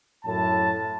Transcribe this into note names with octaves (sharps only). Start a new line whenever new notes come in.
F#2 A2 A5